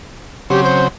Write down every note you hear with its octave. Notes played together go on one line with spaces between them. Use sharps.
C#3 F#3 C4 G4
C5